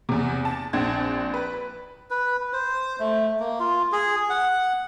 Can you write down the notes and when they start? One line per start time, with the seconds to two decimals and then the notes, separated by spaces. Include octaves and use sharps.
0.09 E2 C3
0.45 A5
0.73 A#1 C4 D4 G#6
1.34 B4
2.11 B4
2.53 C5
3.00 A3
3.40 A#3
3.60 F4
3.92 G#4
4.30 F#5